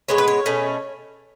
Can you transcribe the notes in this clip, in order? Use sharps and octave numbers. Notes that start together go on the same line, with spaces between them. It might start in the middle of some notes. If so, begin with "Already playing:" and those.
A2 G#3 B3 C#5
B4
C#5
B2 A3 C#4